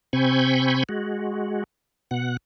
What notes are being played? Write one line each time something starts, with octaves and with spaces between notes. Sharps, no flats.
C3 C4 G#5 B5 C#6 G6
G#3 F#4
B2 F#5